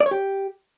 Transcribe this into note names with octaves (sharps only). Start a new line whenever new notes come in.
D5
C#5
G4